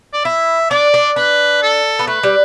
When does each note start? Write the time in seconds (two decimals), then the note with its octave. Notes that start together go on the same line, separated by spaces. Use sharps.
0.13 D5
0.25 E4 E5
0.70 D4 D5
0.94 D4
1.16 D4 B4
1.63 A4
1.99 B3
2.07 A3 B4
2.23 G3